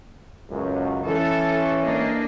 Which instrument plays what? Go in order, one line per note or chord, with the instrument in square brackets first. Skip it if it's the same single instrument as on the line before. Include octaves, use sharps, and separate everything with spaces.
[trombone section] C#2 F#2
[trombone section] E3 C#4 [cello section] A4
[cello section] A#3 D4 D#5